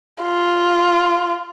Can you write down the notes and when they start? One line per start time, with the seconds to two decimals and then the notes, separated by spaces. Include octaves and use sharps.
0.23 F4